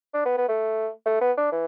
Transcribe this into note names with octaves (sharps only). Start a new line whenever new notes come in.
D4
B3
B3
A3
A3
B3
D4
E3